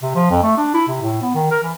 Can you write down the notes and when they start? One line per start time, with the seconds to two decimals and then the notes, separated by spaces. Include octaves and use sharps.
0.02 C3
0.15 F3
0.31 F2
0.43 A3
0.58 D4
0.74 E4
0.88 C3
1.01 A2
1.22 B3
1.35 D#3
1.51 A#4
1.63 E3